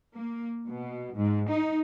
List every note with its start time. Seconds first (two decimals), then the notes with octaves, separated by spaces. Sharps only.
0.14 A#3
0.67 B2
1.15 G#2
1.49 D#4